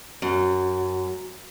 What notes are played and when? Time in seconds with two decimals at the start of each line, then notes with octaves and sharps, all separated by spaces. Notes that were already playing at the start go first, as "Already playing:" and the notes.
0.22 F#2